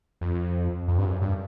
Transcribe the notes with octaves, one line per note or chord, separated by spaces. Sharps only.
F2
F2
G2
F#2
G2